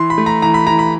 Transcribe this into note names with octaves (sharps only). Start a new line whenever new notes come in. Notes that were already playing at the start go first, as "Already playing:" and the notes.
Already playing: E3 C6
B5
A3
A#5
E3 A#5
B5
E3 A#5
B5